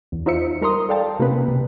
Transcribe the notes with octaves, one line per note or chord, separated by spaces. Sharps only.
E2
D#4 F4 C5 E5 C#7
G3 A#4 A#5 C6 D#6
A4 D5 F5 G5 A5
C3 A#3 B3 C#4 B4
C3